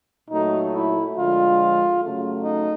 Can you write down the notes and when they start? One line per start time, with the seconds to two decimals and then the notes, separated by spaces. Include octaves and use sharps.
0.30 A#2 F#3 A3 D#4
0.73 E4
1.16 D3 F3 G#3 F4
2.01 C#3 F#3 A3
2.43 D#4